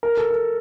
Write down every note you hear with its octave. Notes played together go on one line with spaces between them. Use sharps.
A#4
A4
A#4